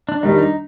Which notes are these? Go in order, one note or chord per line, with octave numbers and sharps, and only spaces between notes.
D4
D#3 G3 D4 D#4
D#4